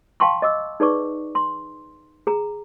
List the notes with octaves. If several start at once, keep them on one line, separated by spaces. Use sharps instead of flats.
F5 G5 A5 C6 C#6
D#5 D6 E6
D#4 G#4 B4 D5 C#6 D6
C6
G#4 A#5